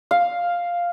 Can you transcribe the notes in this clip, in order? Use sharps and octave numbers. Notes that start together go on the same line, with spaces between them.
F5